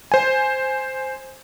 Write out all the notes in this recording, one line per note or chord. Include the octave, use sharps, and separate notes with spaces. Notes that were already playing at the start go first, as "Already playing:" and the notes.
C5 G#5